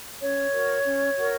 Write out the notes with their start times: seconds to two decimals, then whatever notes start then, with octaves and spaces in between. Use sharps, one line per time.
0.21 C#4 C#5
0.53 F#4 A#4
0.84 C#4
1.17 F#4 A#4